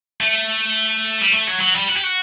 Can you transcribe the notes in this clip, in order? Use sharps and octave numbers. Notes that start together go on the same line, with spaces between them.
A3
G3
A3
F#3
F#3
G3
F#4
G4
F#4